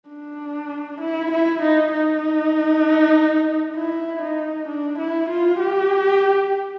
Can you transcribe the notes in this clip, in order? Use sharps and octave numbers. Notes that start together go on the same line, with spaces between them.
D4
E4
E4
D#4
D#4
E4
D#4
D4
E4
F4
G4